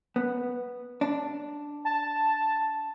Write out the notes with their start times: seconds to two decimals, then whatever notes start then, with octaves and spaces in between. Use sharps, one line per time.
0.16 B3
1.01 D4
1.85 A5